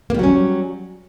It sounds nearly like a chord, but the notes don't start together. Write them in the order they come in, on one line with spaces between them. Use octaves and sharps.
A#3 G3 F#3 C#4